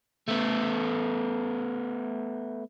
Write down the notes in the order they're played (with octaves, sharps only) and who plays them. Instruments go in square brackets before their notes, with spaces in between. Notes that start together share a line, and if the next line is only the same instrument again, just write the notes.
[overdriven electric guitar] A3 B3